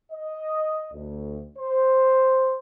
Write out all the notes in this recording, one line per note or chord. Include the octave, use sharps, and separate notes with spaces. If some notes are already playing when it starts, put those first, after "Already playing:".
D#5
D2
C5